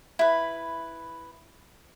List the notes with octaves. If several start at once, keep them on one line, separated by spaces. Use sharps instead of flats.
E4 B4